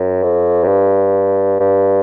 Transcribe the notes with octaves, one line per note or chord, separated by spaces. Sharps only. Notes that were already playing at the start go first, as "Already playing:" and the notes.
Already playing: F#2
F2
F#2
G2
G2